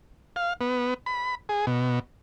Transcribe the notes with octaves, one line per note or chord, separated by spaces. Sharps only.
F5
B3
B5
G#4
B2